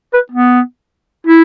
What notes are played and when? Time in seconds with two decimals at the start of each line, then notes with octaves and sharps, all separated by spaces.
0.13 B4
0.32 B3
1.27 E4